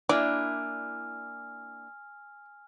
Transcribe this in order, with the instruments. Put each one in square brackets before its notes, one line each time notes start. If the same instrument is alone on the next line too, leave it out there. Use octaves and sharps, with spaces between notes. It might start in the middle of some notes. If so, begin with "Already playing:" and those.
[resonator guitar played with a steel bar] A#3 D4 E4 [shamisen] D5 [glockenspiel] G#5 E6 F6